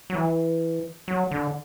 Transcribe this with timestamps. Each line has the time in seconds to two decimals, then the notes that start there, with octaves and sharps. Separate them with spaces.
0.10 F#3
0.15 E3
1.08 F#3
1.31 D3